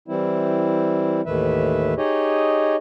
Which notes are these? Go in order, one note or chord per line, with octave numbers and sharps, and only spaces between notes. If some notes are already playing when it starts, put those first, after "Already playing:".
E3 G3 C4 E4
D#2 A2 D#3 E3 B4 E5
D#4 G4 G#4 C#5 D#5